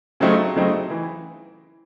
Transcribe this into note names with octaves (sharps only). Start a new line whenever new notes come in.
C#3 F#3 A3 C4 D#4
C#3 F#3 A3 C4 D#4
E3